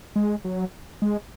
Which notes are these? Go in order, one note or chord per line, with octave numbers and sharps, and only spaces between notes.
G#3
F#3
G#3